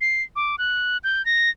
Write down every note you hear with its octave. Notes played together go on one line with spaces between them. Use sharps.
C7
D6
F#6
G6
A#6